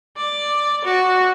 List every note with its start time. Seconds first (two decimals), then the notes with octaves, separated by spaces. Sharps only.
0.17 D5
0.85 F#4